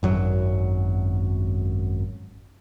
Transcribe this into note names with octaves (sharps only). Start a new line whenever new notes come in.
G#1 F#2 F#3